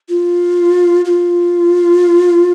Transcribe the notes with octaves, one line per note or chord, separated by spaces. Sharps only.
F4
F4